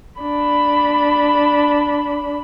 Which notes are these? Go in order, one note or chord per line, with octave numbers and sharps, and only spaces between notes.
D4 B5